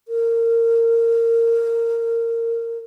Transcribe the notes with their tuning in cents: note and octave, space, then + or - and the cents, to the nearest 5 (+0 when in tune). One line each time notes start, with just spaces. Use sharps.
A#4 -20